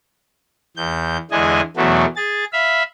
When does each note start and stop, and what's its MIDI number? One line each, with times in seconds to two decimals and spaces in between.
0.77 1.17 40
0.77 1.17 91
1.31 1.61 40
1.31 1.61 50
1.31 1.61 52
1.31 1.61 56
1.31 1.61 75
1.31 1.61 80
1.76 2.05 40
1.76 2.05 47
1.76 2.05 52
1.76 2.05 54
1.76 2.05 57
2.16 2.44 68
2.16 2.44 93
2.53 2.83 76
2.53 2.83 77
2.53 2.83 83